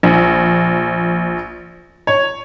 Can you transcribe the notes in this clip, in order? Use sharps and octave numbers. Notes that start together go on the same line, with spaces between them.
A#1
C#5